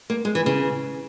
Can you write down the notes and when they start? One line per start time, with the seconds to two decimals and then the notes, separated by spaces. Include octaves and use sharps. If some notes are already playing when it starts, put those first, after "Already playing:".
0.10 A#3
0.25 G#3
0.35 E3
0.46 C#3